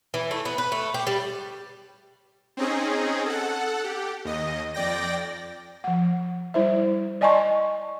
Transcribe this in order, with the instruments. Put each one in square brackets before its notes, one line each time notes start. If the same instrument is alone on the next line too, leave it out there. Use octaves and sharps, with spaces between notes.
[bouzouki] E3
A3
B3
B4
A3
G4
G3
[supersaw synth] C4 C#4 D#4 G#4
A4 F#5
G4
D#2 D#5
F2 D5 G5 A#6
[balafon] F3 F#5
G3 E4 C5 E5
D5 D#5 G#5 A5 C6 C#6